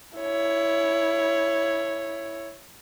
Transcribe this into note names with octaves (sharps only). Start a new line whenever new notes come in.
E4 C#5